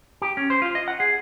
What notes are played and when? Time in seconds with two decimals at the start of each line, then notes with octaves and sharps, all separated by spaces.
0.22 G4
0.37 C#4
0.50 C5
0.62 F4
0.75 D#5
0.88 F#5
1.00 G#4